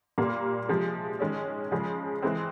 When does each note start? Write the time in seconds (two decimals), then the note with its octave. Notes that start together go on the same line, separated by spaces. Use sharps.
0.18 A#2 G3 A#3
0.69 C3 F3 G#3
1.20 D#3 G#3 C#4
1.72 C#3 F3 G#3
2.23 E3 G#3 C4